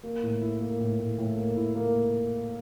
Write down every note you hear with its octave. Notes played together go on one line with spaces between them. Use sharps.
A#3
A2
E4
A#3
A2
A2
A2
A#3
E4
A#3